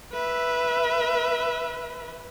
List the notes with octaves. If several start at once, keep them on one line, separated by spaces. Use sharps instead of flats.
B4 E5